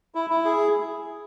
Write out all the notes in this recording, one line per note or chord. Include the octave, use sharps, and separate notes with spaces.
E4
E4
G#4